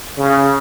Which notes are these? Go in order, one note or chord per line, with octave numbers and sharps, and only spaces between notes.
C#3